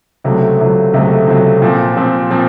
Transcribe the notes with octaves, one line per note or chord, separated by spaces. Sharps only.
C#2 C3 F#3 A3
C#2 C3 F#3 A3
C#2 C3 F#3 A3
C#2 C3 F#3 A3
A#2 F3 C4
A#2 F3 C4
A#2 F3 C4